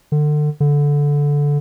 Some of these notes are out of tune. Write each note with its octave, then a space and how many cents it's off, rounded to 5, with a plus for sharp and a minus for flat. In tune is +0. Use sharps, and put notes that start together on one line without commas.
D3 +30
D3 -15